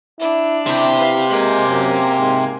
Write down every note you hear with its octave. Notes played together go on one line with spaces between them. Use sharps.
D4 E4
C3 E4 G4
B4 F5
G#3 A#3 G#5
F#2
G#2